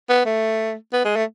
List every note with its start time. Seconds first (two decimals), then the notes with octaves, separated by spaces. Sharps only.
0.09 B3
0.26 A3
0.93 B3
1.05 G#3
1.16 A3